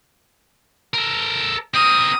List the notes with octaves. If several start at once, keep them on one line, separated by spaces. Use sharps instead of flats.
A4 A#4
C4 A#4 D#6